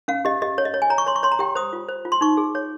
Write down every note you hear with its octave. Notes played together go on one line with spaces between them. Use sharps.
C#4 F5
G4 D#5
G4 D#5
C#5
D#5
C#5
G#5
C#5 A#5
C#6
C#5 C6
C#6
C#5 C6
A#5
G4 G5
C5 D#6
F4
C5
F4
C6
D#4 C#6
G#4
C#5